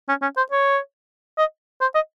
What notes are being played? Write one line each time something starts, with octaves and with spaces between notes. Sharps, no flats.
C#4
C#4
C5
C#5
D#5
C5
D#5